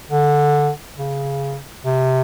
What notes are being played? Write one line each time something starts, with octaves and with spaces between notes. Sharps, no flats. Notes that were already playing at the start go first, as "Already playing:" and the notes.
D3
C#3
C3